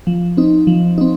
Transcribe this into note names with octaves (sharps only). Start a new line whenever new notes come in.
F3
C4 D#4
F3
C4 D#4